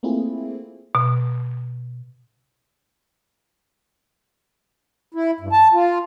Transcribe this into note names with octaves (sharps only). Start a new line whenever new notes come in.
A3 A#3 C4 E4 F4 G#4
B2
E4
G2
A5
F4